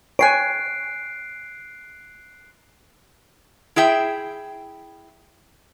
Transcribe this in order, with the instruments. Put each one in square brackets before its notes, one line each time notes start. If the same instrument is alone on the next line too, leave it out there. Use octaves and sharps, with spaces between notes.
[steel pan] C#5 G5 G#5 [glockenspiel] F#6 C7 D7
[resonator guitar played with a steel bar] E4 G#4 E5 G5